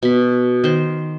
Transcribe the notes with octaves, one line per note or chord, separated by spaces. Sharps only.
B2 B5
D#3 C5